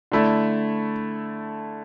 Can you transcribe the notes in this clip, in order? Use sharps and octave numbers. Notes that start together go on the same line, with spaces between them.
D3 A3 E4